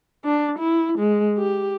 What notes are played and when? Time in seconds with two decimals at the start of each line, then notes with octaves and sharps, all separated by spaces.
0.24 D4
0.59 E4
0.99 G#3
1.38 G4